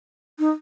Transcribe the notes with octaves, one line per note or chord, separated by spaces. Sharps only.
D#4